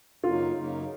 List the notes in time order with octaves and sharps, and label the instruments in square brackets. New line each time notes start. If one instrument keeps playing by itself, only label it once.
[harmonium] F#2 C#3 F#3 A#3 D#4 [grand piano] F4
[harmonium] F#2 C#3 F#3 A#3 D#4